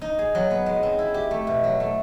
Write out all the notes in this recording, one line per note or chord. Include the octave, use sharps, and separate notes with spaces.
D#4
G#4
F#3
B3
G#3
C4
E4
G4
A3
B2
F#3
A3